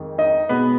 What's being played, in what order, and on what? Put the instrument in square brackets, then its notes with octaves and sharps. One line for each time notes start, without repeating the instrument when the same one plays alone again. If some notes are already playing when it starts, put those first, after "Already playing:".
Already playing: [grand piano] F2 D#3 G#3
D#4 D#5
B2 G#3 B3 B4